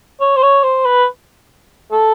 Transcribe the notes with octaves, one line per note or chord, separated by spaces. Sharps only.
C#5
C5
C#5
C5
B4
A4